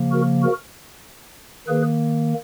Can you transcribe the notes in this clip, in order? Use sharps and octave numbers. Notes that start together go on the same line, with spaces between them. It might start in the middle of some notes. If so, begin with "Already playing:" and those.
Already playing: C#3 F3 A#3
F#4 A#4
F#4 A#4
D#3 A#3 G#4 B4